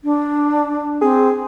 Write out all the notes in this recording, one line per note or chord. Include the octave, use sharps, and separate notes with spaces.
D4
C4 G#4